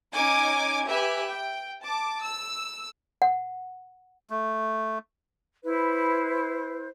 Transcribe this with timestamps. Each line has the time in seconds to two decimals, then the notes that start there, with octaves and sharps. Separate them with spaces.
0.12 C#4 D#4 G#5 D6 G#6
0.88 G4 B4 E5 G#5
1.30 G5
1.82 A5 D6
2.21 E6
3.22 F#5
4.30 A3
5.64 E4 B4 C5